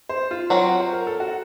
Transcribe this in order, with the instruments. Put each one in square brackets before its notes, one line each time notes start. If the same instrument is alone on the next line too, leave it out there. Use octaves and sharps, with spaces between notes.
[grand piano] C5
F4
[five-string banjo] F#3 C4 F#4
[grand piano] C5
A#4
A4
F#4